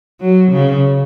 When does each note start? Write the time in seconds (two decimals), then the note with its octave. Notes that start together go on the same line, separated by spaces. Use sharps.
0.21 F#3
0.52 C#3